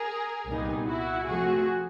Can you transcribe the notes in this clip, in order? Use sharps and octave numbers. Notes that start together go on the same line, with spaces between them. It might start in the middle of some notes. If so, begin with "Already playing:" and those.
Already playing: G#4 A#4
C2 A#2 G3 B3 D#4
E4 F#4
C3 F3 A3 F#4 G#4